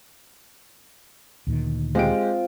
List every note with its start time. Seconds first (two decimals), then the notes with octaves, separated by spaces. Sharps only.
1.47 D2 A#2 D#3
1.95 G#3 C4 F4 G4 F5 D7